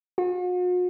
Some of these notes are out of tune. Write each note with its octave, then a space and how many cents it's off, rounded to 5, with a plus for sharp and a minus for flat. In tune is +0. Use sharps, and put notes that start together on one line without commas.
F#4 -45